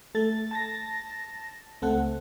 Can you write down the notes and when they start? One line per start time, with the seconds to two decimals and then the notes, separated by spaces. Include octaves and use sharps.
0.15 A3 A4 A6
0.51 A5 A6 A#6
1.82 C#2 A3 C4 A4 F#5